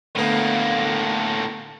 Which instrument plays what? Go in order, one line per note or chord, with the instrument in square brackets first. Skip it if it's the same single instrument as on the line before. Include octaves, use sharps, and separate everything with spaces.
[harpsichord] D2 B3 [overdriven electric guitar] A2 A#3